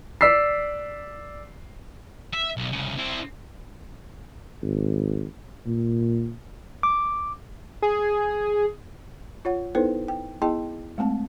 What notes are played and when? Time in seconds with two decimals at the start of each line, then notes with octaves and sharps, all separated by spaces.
0.21 D5 E6 B6 C7
2.33 E5
2.57 B1
2.72 C2 C#3
2.98 C4 E4
4.62 G#1
5.66 A#2
6.83 D6
7.82 G#4
9.45 F4 C#5 F#5
9.75 B3 D#4 E4 A4 B4 C5
10.08 G5
10.42 B3 E4 G#4 D#5 G5 A5
10.98 G#3 A3 C4 A5